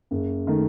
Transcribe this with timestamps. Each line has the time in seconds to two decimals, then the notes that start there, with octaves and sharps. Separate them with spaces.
0.11 F#1
0.47 D#3 A3